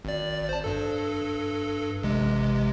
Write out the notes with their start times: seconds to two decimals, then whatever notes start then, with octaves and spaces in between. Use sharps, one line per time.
0.05 G#1 D5
0.49 C5 A5
0.64 G2 A4
2.03 A1 C3 G#3